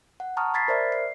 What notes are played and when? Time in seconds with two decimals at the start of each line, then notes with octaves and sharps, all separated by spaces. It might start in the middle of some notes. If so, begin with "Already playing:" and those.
0.20 F#5
0.37 A5 A#5 C#6 D#6 F6
0.54 B5 G#6 A6 B6 C7
0.68 A#4 C5 D5 E5 F6
0.92 C7